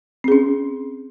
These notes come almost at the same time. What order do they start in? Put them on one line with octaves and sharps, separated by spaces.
C4 G#4 C#4